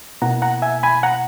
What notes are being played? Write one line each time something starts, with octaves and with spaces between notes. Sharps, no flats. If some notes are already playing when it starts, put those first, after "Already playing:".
B2 A#3 E4 F#5 A#5
F#5 A#5
E5 G#5
G#5 B5
F#5 A#5